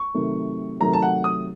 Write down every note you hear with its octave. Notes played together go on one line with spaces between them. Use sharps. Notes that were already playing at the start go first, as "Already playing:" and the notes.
Already playing: C#6
C3 D#3 F#3 A3
C3 D#3 F#3 A3 A#5
A5
F#5
D#6